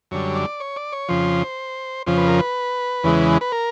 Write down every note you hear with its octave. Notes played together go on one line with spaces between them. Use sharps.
F#2 D3 G3 C#5
D5
C#5
D5
C#5
F2 C#3 F3 C5
F2 C#3 F3 C5
B4
A#4
B4
E2 C#3 E3 G#3
B4
A#4